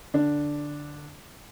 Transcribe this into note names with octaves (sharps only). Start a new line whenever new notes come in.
D3 D4